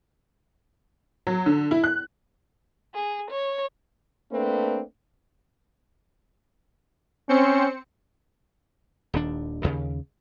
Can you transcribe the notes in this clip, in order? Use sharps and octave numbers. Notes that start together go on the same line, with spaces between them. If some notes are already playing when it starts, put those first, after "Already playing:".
F#3
D3
E4
F#6
G#4
C#5
A3 A#3 C4 D4 B4
C4 C#4 C5 C#7
D#1 D#2 D4
D#2 C#3